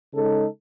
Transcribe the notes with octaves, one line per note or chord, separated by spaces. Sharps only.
C#3 G#3 D#4 A4